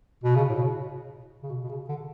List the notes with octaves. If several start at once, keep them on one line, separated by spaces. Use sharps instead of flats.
B2
C#3
A2
B2
C#3
B2
B2
C#3
D3